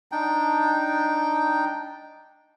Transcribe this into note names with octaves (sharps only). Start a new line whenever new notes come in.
D4 D#4 G5